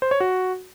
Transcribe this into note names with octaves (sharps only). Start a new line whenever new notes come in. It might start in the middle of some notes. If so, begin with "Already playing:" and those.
C5
C#5
F#4